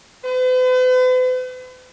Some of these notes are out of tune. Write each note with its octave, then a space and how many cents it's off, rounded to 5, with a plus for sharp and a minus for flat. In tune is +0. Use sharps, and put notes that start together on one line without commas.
B4 +45